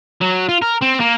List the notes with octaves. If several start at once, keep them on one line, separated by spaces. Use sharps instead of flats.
F#3
F4
A#4
C4
A#3